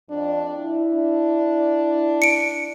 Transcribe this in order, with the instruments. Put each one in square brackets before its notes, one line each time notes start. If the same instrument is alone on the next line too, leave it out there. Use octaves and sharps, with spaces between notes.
[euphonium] F2 [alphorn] D4
[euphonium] E4
[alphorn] D4
[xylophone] C#7 D7